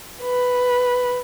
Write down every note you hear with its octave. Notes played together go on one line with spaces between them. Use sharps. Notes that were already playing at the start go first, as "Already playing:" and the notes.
B4